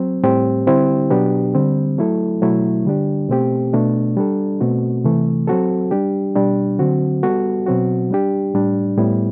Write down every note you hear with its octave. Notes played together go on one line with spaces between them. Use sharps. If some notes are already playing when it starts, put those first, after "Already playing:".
Already playing: F#3 C4
A2 G3 C4 G4
D3 G3 C4 E4 G4
B2 F#3 B3 D4 G4
D3 G3 C4
F#3 A3 E4 A4
B2 F#3 A3 E4
D3 G3 D4 G4
B2 A3 C4 G4
B2 A3 D4
G3 D4 A4
B2 A3 C4 F#4
C3 E3 A3
F#3 C4 F#4 A4
G3 D4 G4
B2 G3 D4
D3 F#3 C4 F#4
G3 B3 F#4 A4
B2 F#3 C4 F#4
G3 D4 G4
A2 G3 D4
A2 G3 B3 E4